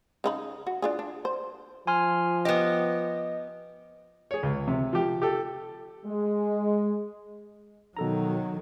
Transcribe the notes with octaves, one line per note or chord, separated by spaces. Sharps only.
C#3 D#4 B5
F#4
D4 F4 G#4
D4
C5
F3 G#5 C6 F6
B3 G4 D#5
G#4 C#5
C#2
C3
F3 G4
G4 A4
G#3
B2 D#3 F#3 A4 A#5